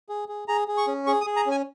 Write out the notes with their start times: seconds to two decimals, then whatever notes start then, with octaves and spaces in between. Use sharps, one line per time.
0.09 G#4
0.28 G#4
0.48 G#4 A#5
0.68 G#4
0.77 C#6
0.87 C#4
1.07 G#4 C#6
1.21 D#6
1.26 G#4
1.36 A#5
1.46 C#4 G#5